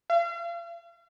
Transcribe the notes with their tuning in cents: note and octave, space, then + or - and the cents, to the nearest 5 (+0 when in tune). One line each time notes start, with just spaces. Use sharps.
F5 -40